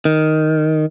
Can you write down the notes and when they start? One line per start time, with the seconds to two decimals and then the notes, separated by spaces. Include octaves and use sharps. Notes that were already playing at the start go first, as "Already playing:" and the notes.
0.05 D#3